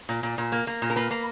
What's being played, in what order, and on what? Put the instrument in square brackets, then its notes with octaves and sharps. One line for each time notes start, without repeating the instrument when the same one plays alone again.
[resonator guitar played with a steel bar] A#2
A#2
A#2
A#3
A#3
A#2
A#4
A#3 B4
A#3